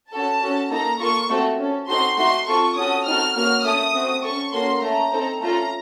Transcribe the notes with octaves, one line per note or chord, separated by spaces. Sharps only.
C#4 F#4 A4 A5
C#4 F#4 A4
A#3 D#4 A4 A#5
A#3 F4 A4 C#6
A3 C4 F#4 A4
C#4 A4
C4 D#4 F#4 A4 C6
A3 D#4 F#4 C6
C4 F4 A4 C#6
C#4 F#4 A4 D#6
C4 D#4 F#4 A4 F6
A#3 C#4 F#4 F6
A3 C#4 A4 D#6
A3 C4 F#4
C#4 A4 C#6
A#3 C#4 F#4 A4 C6
A3 C#4 A4 A#5
C4 D#4 A4
A3 C#4 F4 A4 A#5